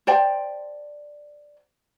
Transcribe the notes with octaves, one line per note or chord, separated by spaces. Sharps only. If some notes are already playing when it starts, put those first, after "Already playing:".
C5 D5 G5 A5